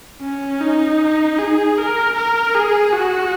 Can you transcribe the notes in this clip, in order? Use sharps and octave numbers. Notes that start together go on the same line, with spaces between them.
C#4
D#4
G#4
A#4
A#4
G#4
F#4